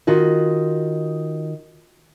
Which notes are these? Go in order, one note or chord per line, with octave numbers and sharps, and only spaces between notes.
D#3 F4 F#4 D#5